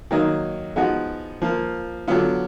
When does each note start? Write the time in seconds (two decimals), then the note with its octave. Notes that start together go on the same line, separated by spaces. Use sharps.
0.11 D#3 F#3 A#3 D#4
0.76 F3 G#3 B3 D#4 F#4
1.42 F3 A#3 F4
2.08 D3 F#3 B3 F4